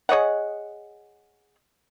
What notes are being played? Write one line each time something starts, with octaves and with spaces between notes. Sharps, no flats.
G#4 C#5 D#5 F#5